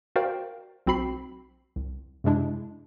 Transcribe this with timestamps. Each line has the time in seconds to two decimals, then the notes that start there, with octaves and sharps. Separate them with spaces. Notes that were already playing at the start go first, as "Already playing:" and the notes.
0.16 F#4 A#4 C5 D5 F5 G5
0.87 B1 C4 F#4 B5 C7
1.76 C2
2.24 F#2 C3 G#3 D4 E4